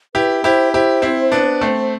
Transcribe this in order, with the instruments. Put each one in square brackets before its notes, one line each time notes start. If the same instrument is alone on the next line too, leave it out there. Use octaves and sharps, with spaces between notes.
[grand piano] E4 G4 [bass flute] B4
[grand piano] E4 G4 [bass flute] C5
[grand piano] E4 G4 [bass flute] C5
[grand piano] C4 E4
B3 D4
A3 C4